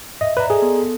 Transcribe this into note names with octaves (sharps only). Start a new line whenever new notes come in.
D#5 E5
B4 D5 D#5 A#5
G#4 A4
B3
A4